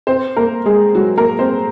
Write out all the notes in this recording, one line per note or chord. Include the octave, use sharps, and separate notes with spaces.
C4 C5
A#3 A#4
G#3 G#4
F#3 F#4
A#3 A#4
C4 C5